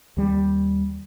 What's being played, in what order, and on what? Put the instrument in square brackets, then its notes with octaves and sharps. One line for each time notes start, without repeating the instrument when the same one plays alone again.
[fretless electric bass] D#2 G3